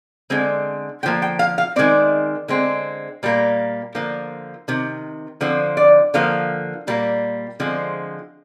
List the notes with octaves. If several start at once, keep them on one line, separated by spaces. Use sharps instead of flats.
D3 G#3 C4
D3 F3 A#3 G5
G5
F5
F5
D#3 G#3 C4 D5
D3 G#3 C4
A#2 G3 A#3
D3 F3 A#3
C3 D#3
D3 F3 C4
D5
D3 F3 A#3 F5
A#2 G3 A#3
D3 F3 G#3 C4